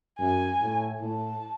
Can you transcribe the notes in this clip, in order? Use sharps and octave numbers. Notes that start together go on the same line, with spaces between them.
F#2 G#5
A2
A2 A5